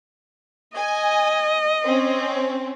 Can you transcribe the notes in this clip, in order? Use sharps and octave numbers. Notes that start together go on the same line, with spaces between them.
D#5 G#5
C4 C#4